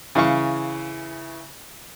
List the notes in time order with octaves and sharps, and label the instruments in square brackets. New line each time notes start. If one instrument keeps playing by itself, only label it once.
[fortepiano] C#3 E3 F5 C#6